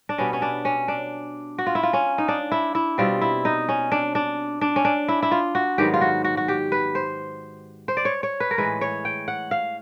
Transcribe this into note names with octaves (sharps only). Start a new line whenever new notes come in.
D4
B2 G3 B3 C#4
C#4
D4
C#4
D4
F#4
F4
E4
F4
C#4
D#4
D4
E4
E4
B2 G3 C4 F4
E4
D#4
C#4
D4
D4
D4
C#4
D4
E4
E4
F4
F#4
G#2 D#3 F#3 B3 G4
F4
F#4
F#4
F#4
G4
B4
C5
C5
D5
C#5
C#5
B4
A#4
A2 E3 G#3 B4
C#5
G5
F#5
F5